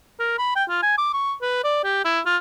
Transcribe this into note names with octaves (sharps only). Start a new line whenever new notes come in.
A#4
B5
G5
F4
G#5
D6
C#6
B4
D5
G4
E4
F4